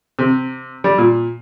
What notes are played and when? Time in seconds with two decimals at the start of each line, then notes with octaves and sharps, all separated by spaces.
0.19 C3
0.84 G3
0.98 A#2